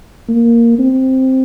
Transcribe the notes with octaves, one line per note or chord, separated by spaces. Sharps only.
A#3
C4